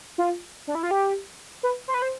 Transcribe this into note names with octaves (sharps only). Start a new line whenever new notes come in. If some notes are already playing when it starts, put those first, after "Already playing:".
F4
D4
E4
F4
G4
B4
C5
B4
C5